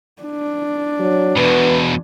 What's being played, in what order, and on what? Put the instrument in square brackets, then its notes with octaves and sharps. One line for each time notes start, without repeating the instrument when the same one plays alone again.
[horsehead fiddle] D4
[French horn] F#3
[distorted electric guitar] E2 B2 [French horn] B3